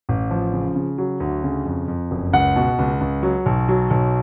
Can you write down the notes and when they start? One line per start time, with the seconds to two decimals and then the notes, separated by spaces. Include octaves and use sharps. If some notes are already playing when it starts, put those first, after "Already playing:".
0.09 A1
0.31 F3
0.53 C#3
0.75 C#3
0.98 F#3
1.20 D2
1.43 C#3
1.66 F2
1.88 F2
2.11 F#1
2.33 C#2 F#5
2.56 B2
2.79 C#2
3.01 C#2
3.23 F#3
3.46 B1
3.69 F#3
3.91 B1